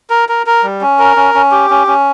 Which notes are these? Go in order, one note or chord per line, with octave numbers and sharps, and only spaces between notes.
A#4
A#4
A#4
G3
C#4
A#4
C#4
C#4
G4
C#4
C#4